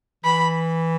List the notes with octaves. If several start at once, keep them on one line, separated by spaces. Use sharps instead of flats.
E3 B5